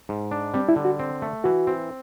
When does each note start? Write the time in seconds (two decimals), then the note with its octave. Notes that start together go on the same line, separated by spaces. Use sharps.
0.09 G#2
0.31 D4
0.54 G3 C4
0.69 E4
0.76 D3
0.85 F#4
0.99 C4
1.22 A3
1.44 E3 F#4
1.67 C4